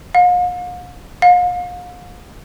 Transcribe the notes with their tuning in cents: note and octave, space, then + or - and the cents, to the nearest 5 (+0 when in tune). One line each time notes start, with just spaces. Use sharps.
F5 +45
F5 +40